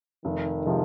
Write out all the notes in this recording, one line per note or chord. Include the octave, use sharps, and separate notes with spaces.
F1 D#3
C3 F3 G#3